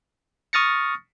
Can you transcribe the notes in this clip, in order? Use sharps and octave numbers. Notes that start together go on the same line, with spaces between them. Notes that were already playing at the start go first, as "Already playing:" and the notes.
C#6 D#6 F6 A6 A#6 C#7